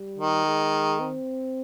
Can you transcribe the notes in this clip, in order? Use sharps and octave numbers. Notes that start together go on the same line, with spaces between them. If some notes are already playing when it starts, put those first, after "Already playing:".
Already playing: G3
D#3
G#3
C4